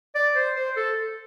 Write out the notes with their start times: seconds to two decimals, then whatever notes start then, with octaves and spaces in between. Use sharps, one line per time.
0.15 D5
0.35 C5
0.55 C5
0.76 A4